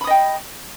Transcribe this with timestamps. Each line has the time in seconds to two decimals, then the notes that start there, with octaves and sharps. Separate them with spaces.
0.01 B5
0.04 D#6
0.07 D#5
0.10 G5